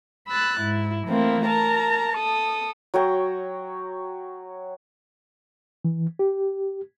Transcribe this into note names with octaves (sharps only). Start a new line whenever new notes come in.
B5 E6 F#6 A6
G#2 E4
E3 A3 A#3 C4 E4
A#4 A5 A#5
A4 D#6
F#3 C#5 G5 A#5
E3
G4